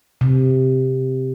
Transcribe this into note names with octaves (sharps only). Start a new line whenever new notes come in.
C3